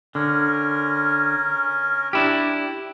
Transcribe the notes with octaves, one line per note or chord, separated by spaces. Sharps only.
D3 C#4 A#4
D4 E4 G4